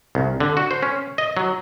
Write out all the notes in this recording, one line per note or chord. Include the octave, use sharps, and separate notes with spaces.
C2
D3
F#4
C5
C#4
D#5
F#3